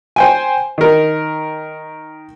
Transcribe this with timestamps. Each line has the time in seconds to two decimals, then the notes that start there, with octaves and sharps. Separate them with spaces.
0.16 C5 G5 G#5
0.78 D#3 A#4